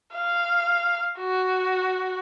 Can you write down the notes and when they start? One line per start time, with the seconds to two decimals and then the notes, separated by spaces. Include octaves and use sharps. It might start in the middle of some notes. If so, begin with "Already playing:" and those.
0.14 F5
1.18 F#4